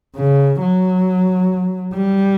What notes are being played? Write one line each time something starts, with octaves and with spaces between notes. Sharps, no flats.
C#3
F#3
G3